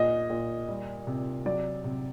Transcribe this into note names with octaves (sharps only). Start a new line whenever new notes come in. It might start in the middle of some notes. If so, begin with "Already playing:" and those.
Already playing: A#2 D#5
A#2
G3
C3
F#3 D5
C3